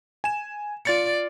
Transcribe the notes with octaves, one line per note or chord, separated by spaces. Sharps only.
G#5 E7
F4 D5 A6 C#7